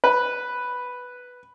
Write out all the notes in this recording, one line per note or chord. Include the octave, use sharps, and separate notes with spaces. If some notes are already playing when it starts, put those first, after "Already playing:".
B4